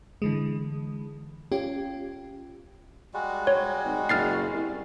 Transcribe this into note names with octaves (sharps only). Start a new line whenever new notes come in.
D3 E3 G#3
C#4 F4 G4
G3 G#3 F#4
C#5
G#1
F#1 F6 A6 C7
C2